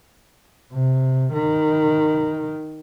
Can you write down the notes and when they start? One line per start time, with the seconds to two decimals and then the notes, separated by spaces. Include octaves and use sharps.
0.73 C3
1.33 D#3